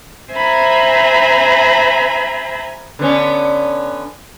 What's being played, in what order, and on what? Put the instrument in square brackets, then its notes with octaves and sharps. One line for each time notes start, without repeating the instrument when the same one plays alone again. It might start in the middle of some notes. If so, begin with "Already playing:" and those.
[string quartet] C5 E5 G#5 A#5 B5
[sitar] D3 B3 C#4